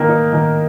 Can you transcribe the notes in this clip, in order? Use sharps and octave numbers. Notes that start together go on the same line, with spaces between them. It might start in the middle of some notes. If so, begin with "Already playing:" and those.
Already playing: D#3 A#3
D#4
D#3